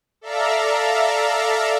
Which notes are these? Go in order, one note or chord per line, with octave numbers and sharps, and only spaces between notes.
A4 D5 E5 F5 A#5